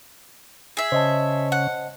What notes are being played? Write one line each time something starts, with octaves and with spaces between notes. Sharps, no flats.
G#4 E5
C#3 C5 C#5 D#5 A5
F#5